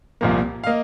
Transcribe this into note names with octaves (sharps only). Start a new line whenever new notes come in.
C2 A#2 F3 A#3
F5
A#3 D#5